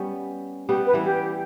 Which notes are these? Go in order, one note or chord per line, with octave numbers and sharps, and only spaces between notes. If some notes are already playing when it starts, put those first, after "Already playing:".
Already playing: G3 B3 C#4
G3 B3 G4
B4
E3 G3
G4